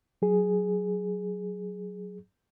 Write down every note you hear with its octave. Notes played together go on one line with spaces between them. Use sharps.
F#3 G#4